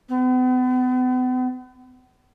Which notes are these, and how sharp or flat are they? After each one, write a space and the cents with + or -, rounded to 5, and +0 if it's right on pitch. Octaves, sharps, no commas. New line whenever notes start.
B3 +40